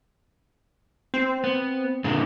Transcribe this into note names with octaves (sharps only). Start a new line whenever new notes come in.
C4
B3
A#2 D3 G#3